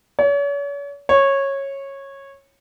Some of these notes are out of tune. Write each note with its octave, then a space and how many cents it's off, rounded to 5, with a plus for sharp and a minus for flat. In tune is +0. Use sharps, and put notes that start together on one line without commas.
C#5 +40
C#5 -15